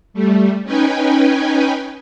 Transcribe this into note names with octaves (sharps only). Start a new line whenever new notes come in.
G3 A3
C#4 D#4 B4 G5 G#5